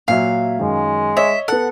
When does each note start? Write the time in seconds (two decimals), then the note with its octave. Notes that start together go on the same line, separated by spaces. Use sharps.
0.08 A#2 F#3 E5 F5
0.59 F#2 D#3 G#3
1.17 C#5 D#5 E5
1.48 B3 A4 F#5